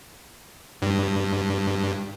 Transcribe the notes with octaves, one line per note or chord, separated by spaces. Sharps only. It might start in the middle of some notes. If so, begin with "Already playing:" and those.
G2